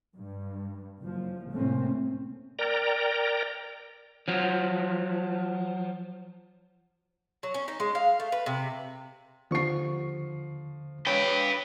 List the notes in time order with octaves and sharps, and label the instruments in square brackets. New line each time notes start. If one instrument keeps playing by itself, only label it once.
[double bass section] G2
F#1 F3
C2 A2 A3 A#3 C4 C#4
[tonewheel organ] A#4 D5 G5 A#5
[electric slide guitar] F3 F#3
[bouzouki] F#3
C#4
D#4
G#3
F5
A3
B4
C3
[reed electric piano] D#2 D3 C#6 [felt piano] F3 C7
[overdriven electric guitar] B4 G5 [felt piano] C#5